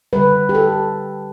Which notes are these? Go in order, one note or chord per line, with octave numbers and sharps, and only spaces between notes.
D3 G3 B4
G4
A4